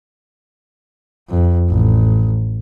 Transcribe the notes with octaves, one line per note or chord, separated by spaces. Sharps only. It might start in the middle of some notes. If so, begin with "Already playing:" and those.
F2
A1